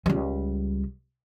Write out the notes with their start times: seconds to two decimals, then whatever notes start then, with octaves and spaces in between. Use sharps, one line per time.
0.06 C#2 G3